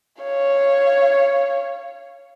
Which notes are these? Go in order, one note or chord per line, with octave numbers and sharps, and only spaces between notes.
C#5 F5